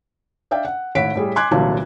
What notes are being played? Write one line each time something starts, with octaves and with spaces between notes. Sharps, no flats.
D4 D5 E5 F5 G5
F#5
G#1 A2 C#5 F#5 B6 D7
A2 G3 G#4
G#5 C6 D6 F#6 G#6
G1 C2 A#2 E3 F#3 A5